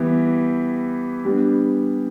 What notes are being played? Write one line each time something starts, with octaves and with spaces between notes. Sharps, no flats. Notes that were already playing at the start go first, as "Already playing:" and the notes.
Already playing: E3 G3 B3 E4 G4
G3 B3 D4